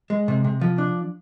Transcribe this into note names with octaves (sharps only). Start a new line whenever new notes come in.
G#3
C3
C3
F3
D4